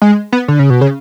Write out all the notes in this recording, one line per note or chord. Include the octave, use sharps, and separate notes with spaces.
G#3
B3
D3
C#3
B2
C#3